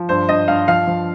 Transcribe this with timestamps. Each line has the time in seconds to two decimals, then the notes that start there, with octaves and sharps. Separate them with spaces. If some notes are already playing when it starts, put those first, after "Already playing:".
Already playing: F3
0.09 G2 C5
0.29 G2 D#5
0.48 G2 F5
0.68 F3 F5
0.87 F3